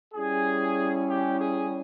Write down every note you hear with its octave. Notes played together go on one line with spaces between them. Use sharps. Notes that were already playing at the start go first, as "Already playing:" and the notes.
G3 C#4 E4 G#4
G4
G#4